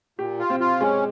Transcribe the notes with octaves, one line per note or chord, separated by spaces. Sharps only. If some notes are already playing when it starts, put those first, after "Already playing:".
A#2 G4
F4
C4
F4
G#3 C#4